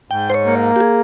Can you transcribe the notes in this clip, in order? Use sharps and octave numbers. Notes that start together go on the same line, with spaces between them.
G#2 G5
C5
C#5
A#3
G4
G#4